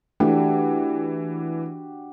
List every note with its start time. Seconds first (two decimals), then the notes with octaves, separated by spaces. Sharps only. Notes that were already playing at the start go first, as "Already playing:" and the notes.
0.20 E3 A3 D4 F#4 G4